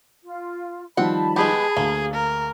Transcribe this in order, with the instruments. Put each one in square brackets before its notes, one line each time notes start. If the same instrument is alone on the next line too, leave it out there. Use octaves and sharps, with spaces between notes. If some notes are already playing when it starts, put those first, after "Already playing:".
[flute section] F4
[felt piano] D#3 F3 G3 [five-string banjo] C4 F#5 [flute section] A5 B5
[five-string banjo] G#3 B3 G4 [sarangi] G#4
[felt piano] D2 F5 [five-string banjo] A#3
[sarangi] A#4